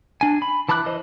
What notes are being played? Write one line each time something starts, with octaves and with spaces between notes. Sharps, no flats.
D4 G#5
B5
E3 A5 B5 D6 F#6
E3 C5 D#5